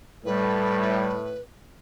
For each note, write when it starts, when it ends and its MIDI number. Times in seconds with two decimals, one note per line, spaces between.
0.25 1.34 45
0.25 1.18 55
0.25 1.41 71